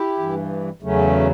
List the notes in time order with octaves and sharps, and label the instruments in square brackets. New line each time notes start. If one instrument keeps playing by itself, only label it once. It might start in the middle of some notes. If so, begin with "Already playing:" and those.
Already playing: [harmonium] E4 G4
G2 E3
E2 C#3 F#3 A3 C#4